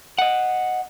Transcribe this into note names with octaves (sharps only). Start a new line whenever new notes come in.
D#5 F#5